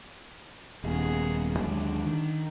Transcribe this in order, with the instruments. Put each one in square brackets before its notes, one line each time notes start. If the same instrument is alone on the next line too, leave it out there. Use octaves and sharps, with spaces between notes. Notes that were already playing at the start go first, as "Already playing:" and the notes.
[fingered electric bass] D#1 [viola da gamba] A#3 B3 G#4
[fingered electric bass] D#2 F#3 G#3 [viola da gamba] D3 D4
[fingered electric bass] D#3